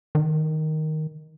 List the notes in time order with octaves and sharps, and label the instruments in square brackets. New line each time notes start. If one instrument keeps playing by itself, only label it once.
[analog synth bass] D#3